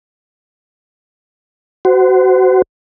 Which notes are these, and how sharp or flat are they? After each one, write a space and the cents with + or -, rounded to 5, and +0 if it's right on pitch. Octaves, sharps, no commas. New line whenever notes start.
F#4 +20 C5 -30